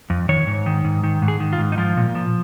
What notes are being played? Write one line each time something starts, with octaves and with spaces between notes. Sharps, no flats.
F2
D#3 C#5
G#2
D#3
G#2
D#3
G#2
G#4
D#3
F4
G#2
D#4
F3 F4
A#2
F3